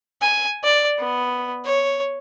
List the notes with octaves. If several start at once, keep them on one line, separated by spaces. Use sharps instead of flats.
G#5
D5
B3
C#5